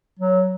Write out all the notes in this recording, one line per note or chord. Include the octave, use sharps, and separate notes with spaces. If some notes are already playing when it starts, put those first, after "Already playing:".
F#3